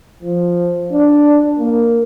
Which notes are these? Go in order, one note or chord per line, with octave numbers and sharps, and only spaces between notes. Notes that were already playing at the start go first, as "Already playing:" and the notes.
F3
D4
A#3